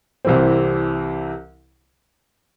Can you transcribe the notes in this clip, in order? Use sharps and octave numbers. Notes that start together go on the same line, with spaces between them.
C2 C3 E3 C4